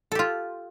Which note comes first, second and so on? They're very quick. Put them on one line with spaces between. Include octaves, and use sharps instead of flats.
A4 G4 F4